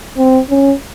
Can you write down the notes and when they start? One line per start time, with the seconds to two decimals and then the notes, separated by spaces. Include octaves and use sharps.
0.18 C4
0.50 C#4